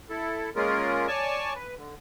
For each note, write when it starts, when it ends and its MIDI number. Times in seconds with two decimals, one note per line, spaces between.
0.10 0.50 64
0.10 0.50 69
0.56 1.07 56
0.56 1.07 58
0.56 1.07 61
0.56 1.07 65
0.56 1.07 68
0.56 1.07 70
1.08 1.54 73
1.08 1.54 74
1.08 1.54 80
1.08 1.54 81
1.08 1.54 85
1.55 1.75 71
1.77 1.95 50